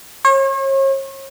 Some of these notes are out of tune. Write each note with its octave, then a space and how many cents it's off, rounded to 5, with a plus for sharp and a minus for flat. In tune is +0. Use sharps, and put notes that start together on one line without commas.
C#5 -40